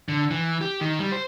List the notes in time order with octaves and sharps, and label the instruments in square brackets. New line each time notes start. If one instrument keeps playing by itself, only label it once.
[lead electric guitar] D3
E3
G4
D#3
G3
C5